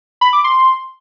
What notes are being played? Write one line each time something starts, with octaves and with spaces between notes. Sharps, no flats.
B5
D6
C6